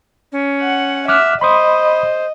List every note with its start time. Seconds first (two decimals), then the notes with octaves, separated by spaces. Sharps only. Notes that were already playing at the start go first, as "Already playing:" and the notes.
0.32 C#4
0.61 F#5
1.08 E5 D6 F6 F#6
1.41 C5 D#5 B5 C6 D#6